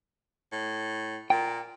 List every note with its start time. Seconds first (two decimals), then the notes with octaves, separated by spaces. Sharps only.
0.52 A2
1.30 A#2 G5